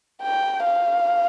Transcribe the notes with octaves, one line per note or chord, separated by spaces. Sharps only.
G5
F5